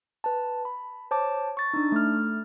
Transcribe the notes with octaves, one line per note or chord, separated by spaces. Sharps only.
B4 A5
B5
C5 C#5 A5 D6
C#6 A6
D4 D#4
A3 F6